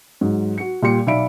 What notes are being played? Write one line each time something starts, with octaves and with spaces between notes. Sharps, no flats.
G#2 F#3
F#4 C#7
A#2 G3 G5 C6 C#7
B1 D5 E5 F5 B5 D7